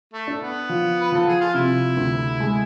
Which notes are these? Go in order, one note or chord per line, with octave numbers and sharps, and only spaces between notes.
A3
D4
B3
F3
B4
F3 A4
G#4
F4
C3 E4
D2
G#3